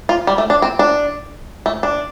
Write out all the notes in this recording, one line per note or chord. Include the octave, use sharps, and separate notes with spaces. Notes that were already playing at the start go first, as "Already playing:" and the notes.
F4
G3
A3
D4
C4
D4
A3
D4